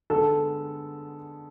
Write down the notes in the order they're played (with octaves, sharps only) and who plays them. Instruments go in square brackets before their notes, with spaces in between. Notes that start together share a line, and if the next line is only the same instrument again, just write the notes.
[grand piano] D3 G#3 B3 [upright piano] A4